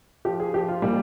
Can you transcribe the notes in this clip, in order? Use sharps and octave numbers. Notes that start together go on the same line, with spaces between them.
F3 G4
G#4
F3 G4
F4
A#2 G3